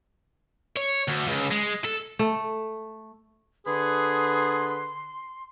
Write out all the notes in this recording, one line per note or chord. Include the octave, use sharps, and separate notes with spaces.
C#5
D2
C#2
G#3
A4
A3
D3 G#4 B4 C6